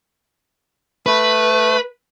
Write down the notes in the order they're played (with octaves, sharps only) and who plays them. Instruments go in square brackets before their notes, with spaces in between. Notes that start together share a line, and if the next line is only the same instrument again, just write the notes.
[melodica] A3 [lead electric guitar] B4